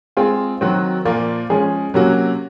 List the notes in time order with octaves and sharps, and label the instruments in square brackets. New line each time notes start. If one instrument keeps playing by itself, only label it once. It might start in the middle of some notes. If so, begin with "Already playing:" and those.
[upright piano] G#3 C4 F4 G#4
D#3 F#3 C4 F#4
A#2 F3 A#3 F4
F3 G#3 C#4 G#4
C3 F#3 A#3 C#4 F#4